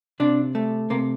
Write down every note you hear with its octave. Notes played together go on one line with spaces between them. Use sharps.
C3 D4
A3
C3 A#3